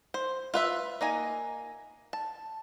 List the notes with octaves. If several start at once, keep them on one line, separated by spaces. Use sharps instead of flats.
C5
F4 B4 E5
A#3 D#4 G#5
A5